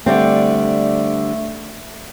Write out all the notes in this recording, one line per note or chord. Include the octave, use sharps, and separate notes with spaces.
D3 G3 A3 C4